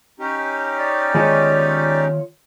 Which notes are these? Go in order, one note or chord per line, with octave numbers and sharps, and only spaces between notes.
C#4 D#4 G4
D5
D#3 G#3 F4 C#5